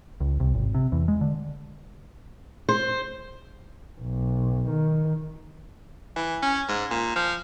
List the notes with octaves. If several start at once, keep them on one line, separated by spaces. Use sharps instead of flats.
C#2
C2
G#1
C3
E2
G#3
D3
C5
B1
D#3
E3
C#4
G#2
A#2
F3